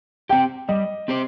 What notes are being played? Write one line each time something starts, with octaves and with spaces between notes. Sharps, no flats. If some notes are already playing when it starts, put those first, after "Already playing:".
C4 G4 G5
G3 D#5
C4 G4 C5